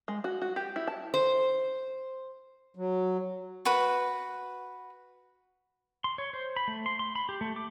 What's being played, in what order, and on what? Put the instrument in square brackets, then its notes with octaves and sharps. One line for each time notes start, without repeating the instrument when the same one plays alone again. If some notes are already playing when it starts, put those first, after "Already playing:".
[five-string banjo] G#3
F#4
F#4
G4
E4
A5
[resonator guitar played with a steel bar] C5
[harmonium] F#3
[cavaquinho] F#4 B4
[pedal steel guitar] C6
C#5
C5
B5
A3
C6
C6
B5
G4
A3
D6